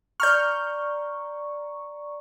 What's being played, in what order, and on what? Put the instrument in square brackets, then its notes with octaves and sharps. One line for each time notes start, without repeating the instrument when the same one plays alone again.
[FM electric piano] D5 A#5 C#6 [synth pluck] F6 G6